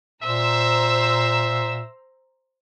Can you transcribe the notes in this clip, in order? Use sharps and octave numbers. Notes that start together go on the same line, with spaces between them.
A#2 C5 E5 A#5 E6